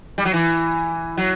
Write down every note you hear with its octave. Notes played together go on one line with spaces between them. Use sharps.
G3
F#3
E3
F#3